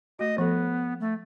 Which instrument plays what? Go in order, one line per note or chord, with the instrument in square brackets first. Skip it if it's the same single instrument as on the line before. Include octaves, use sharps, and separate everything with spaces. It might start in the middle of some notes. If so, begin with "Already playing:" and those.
[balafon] A3 F#4 [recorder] D#5
[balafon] F3 A4 [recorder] B3
[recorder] A3